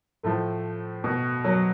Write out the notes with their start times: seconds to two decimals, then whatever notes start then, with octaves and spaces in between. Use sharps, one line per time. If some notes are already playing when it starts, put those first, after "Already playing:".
0.23 A2 F3 A3
1.04 B2
1.45 F#3